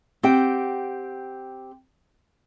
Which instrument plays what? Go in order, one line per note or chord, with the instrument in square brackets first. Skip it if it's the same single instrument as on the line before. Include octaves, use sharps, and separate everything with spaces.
[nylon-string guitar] C4 G4 F#5 G5